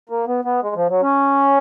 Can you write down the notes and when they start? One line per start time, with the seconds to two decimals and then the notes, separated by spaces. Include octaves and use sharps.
0.09 A#3
0.27 B3
0.45 B3
0.62 G#3
0.75 F3
0.89 F#3
1.02 C#4